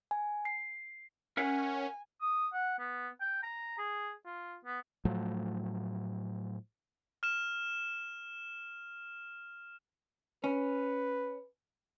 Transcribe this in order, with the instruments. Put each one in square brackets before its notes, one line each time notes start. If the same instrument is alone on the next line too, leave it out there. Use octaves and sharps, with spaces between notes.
[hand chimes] G#5
C7
[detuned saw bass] C#4 [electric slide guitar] A#4 E5 F#5 [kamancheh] G#5
[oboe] D#6
F#5
B3
G5
A#5
G#4
F4
B3
[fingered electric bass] A2 F3 F#3 A3
[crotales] F6 E7
[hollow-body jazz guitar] C#4 [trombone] B4